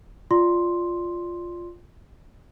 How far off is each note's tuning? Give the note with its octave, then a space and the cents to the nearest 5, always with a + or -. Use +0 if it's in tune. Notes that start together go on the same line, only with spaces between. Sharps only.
F4 +0 D5 +0 C6 +0